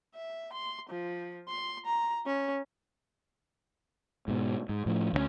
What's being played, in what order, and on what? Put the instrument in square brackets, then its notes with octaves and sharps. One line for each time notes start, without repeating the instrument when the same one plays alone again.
[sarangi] E5
C6
F3
C6
A#5
C#4
[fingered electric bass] G#2 B2
G#2
A2 F3
D2 D#3 C#4